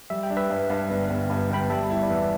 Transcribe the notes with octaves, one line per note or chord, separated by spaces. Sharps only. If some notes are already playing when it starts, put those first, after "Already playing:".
G3 E5
G5
D4
B4 E5
G2
G2
G1
G1
G2 B5
G1 G5 B5
G3 E5 A5
E4
D5
E2 B4 E5